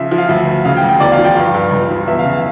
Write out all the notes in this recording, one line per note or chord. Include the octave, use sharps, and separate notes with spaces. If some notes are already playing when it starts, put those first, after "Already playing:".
Already playing: C#3 F3 E5
F3
F5
D2 E5
D2
C#3 F5
G5
D2
G5
E2 D5
F5
F3
G5
G2 F5
G2
C#2
F3
E2 E5
F5
C#3
F5